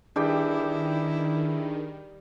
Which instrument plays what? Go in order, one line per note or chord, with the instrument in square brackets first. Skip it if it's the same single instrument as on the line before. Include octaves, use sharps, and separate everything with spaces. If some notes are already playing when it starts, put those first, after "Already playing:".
[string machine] D#3 [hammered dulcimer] G3 G5 D6 [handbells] D4 G#4 B4 [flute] E4